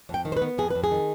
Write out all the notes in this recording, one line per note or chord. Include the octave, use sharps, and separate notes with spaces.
F2
G5
D#3
C5
B4
B3
F2 G#4
F2 B4
G#4
D#3